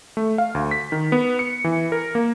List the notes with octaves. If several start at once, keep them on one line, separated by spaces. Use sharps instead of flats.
A3
F5
D2
B6
D#3
B3
C#7
E3
A#4
A#3